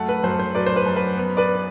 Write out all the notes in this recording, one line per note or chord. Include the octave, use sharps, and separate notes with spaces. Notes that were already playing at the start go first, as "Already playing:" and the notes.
Already playing: F#2 A3 F#5 A5
B4
F#2 C5
C5
F#3 B4 D5
C5
B4
F#2
B4
B3
B4 D5